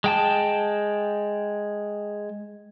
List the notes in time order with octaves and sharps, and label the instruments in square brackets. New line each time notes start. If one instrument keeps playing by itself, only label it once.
[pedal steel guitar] G#3 G5 A5